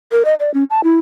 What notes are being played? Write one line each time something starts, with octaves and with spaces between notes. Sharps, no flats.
A#4
D#5
D5
C#4
A5
E4